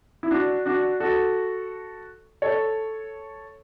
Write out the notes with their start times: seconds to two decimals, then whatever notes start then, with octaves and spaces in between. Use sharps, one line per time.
0.23 E4
0.31 D4 F#4
0.66 D4 F#4
1.00 F#4 A4
2.42 A4 C#5